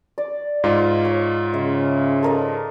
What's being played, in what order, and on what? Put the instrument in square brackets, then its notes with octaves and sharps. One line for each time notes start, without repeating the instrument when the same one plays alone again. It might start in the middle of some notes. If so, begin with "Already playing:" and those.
[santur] D5
[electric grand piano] G#2 F4 [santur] D#5
[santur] C#5
[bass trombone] C#3 [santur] E5
[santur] A4 A#4 D#5